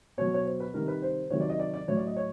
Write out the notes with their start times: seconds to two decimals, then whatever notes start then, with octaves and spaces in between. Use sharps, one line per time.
0.18 B2 F#3 C#5
0.34 C#5
0.45 C5
0.60 B4
0.74 C3 D#3 G3 A#4
0.88 B4
1.02 C5
1.30 C3 D#3 F#3 C#5
1.40 D5
1.49 D#5
1.60 D5
1.74 D5
1.88 A2 F#3 C#5
1.97 D5
2.07 D#5
2.16 C#5